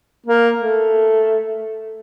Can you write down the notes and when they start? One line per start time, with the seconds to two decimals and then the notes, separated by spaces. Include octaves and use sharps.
0.26 A#3
0.60 A3